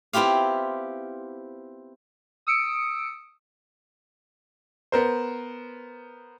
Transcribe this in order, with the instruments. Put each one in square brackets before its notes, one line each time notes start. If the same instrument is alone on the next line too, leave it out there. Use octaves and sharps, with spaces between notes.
[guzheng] B3 C4 E4 F4 G4 F5
[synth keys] D#6 E6 C#7 D7
[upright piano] B3 A#4 C5